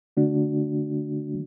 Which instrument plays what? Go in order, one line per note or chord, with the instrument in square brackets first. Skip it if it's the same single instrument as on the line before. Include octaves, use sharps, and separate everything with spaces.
[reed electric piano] D3 A3 D4 F#4